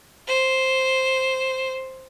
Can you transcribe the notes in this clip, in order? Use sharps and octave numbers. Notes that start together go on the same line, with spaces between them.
C5